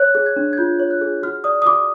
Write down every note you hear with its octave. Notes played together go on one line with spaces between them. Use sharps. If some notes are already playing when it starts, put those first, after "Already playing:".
Already playing: C#5 F#6
G#4
G#6
D4
G#6
F4 G6
C#5
F#6
G#4
F#4 F6
D5 D#6
D#6
F#4 D6